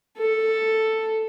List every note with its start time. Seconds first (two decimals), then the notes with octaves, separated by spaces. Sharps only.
0.18 A4